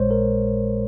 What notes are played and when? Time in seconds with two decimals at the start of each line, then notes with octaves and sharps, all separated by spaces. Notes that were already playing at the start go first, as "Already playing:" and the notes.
Already playing: A#1 A#2 G#3 C5 C#5
0.11 A#4